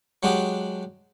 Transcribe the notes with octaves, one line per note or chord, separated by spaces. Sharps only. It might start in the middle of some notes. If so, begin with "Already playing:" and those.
F#3 G#3 D4 F#4 G4